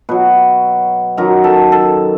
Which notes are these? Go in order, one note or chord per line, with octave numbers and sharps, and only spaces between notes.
B2 F#3 B4
F#2 D#3 F#3 A#4
A4
A4